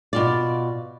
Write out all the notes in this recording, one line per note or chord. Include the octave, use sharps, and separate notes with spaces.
B2 F4 D5